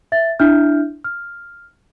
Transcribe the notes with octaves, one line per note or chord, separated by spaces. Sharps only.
E5 A6
D4 E4 E5 F6 G6
F6